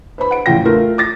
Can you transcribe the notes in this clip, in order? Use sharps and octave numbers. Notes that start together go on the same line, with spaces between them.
B4 C5 B5
F#5 D7
E2 A2 C#3 F4 G5 A#6
A3 F4 A#4
D6 A6 A#6